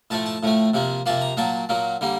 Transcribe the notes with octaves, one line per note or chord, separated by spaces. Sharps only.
A2 F3 A3 A5
A5
A2 F3 A3
C3 F3 A#3
C3 F3 A#3 A5
A#5
A#2 F#3 A#3 A5
A#2 F#3 A#3
D3 G3 A#3